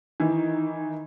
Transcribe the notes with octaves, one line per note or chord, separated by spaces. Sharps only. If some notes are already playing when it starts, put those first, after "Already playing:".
D#3 E3